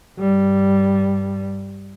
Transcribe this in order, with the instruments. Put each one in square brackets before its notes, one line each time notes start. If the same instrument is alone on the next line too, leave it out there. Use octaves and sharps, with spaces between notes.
[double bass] G2 G3